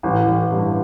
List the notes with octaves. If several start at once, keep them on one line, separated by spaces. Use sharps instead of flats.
A1
A1
G2